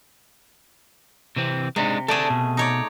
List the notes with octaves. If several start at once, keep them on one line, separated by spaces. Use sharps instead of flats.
C3 E3 C4
C3 G#3 D4 D#4
A3 G#4 A4 D5 A5
B2
D#4 C#5 D5